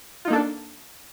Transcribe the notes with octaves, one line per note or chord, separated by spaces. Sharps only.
A#3 D4 D#4 F4 A4